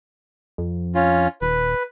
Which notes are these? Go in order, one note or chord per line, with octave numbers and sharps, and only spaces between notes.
F2
C#4 F4
D#1 B4